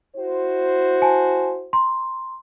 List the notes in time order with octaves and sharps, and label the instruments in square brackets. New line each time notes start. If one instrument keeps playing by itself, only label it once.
[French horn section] E4 F#4 C5
[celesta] G#5 A5
A#5 C6